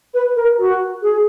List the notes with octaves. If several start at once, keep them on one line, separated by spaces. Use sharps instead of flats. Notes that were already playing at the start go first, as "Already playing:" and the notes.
B4
A#4
F#4
G#4